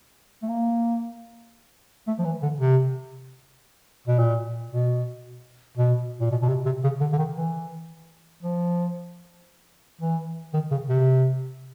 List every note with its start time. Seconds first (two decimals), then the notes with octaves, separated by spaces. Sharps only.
0.43 A3
0.49 A#3
2.07 A3
2.19 F3
2.25 E3
2.43 D3
2.61 C3
4.08 B2
4.19 A#2
4.72 B2
5.78 B2
6.21 A#2
6.31 B2
6.42 B2
6.48 C3
6.66 C3
6.84 C#3
7.01 D3
7.13 D3
7.18 D#3
7.36 E3
8.43 F3
10.01 E3
10.54 D#3
10.71 C#3
10.89 C3